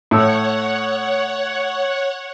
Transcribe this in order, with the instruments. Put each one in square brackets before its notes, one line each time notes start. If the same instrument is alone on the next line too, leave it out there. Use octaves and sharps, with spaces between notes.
[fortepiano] A2 E6 [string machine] C#5 F#5